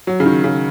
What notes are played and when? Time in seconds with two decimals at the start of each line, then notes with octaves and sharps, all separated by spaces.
0.07 F#3
0.20 C#3
0.26 D#3
0.44 C#3